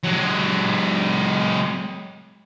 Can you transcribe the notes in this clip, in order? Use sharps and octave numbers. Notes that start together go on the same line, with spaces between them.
F#3 G#3